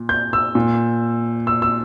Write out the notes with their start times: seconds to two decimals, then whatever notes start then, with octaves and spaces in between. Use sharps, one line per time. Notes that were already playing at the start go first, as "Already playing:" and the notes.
Already playing: A#2
0.09 G6
0.33 E6
0.55 A#2
1.47 E6
1.62 E6